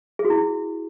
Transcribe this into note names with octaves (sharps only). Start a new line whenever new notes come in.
G#4
F#4
E4